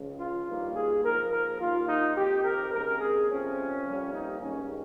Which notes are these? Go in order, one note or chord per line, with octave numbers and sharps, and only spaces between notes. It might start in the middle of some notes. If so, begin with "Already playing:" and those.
Already playing: C#2 C#3 F3
F4
G2 D#3 A#3
G#4
G#2 F3 A#3 A#4
A#4
D#2 D#3 A#3 F4
D#4
F2 C3 D#3 G4
A#4
D#2 C#3 G#3 C4 A#4
G#4
F2 C3 F3 C4 C#4
F2 C3 G3 A#3
D#4
G2 D#3 G#3 C#4